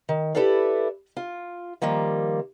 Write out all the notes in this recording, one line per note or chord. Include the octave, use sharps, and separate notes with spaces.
D#3
E4 G4 A4 B4 D5 F5
F4
D#3 F3 G3 A#3